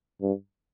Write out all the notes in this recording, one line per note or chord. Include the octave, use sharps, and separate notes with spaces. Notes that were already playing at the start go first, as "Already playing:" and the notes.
G2